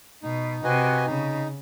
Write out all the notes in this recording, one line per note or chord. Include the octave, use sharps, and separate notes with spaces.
B2 D#4
C3 F#4 B4 D#5 G#5
C#3 D#4